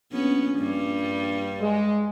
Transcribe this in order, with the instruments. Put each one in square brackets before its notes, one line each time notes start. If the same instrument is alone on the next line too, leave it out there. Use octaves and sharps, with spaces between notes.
[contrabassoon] A#1 [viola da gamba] B3 C#4
[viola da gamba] G2 G3
[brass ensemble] G#3